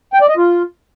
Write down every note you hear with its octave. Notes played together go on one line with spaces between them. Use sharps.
G5
D5
D#5
F4